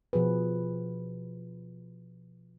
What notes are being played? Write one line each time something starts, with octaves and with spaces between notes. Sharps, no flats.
B2 F3 F#4 G#4 B4